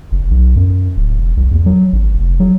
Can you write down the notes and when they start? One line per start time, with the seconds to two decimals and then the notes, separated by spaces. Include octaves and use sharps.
0.12 F#1
0.30 B1
0.56 F#2
0.97 D1
1.18 E1
1.37 C2
1.51 E2
1.66 F#3
1.93 G#1
2.14 F1
2.40 F#3